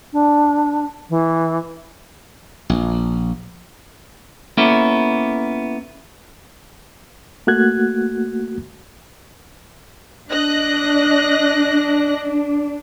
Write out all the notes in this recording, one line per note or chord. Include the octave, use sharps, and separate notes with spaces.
D4
E3
A#1
A#3 B3 C#4 E4 A4
A3 A#3 F#4 F#6 G#6
D4 D#5 F#6 A#6